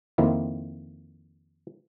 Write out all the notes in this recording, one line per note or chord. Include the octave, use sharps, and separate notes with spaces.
F2 D#3 A#3 C4 E4